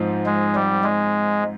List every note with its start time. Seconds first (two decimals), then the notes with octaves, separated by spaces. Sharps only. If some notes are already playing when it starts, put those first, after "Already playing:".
Already playing: G#2 F3 C4 D#4
0.26 G#3
0.55 G3
0.83 G#3